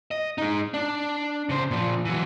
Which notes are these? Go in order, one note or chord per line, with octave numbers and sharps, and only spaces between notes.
D#5
G#3 D#4
D4
C#3 C5
A#2 F3
E3 F#3